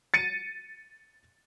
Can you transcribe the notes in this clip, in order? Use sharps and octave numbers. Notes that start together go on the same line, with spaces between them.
A6 C#7 D#7